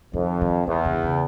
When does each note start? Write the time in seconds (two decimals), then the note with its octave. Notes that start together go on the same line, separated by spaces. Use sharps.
0.13 F2 D#3
0.41 D#3
0.67 E2 D#3
0.85 D3
1.03 C#3